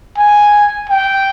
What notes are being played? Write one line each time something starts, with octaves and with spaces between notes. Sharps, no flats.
G#5
G5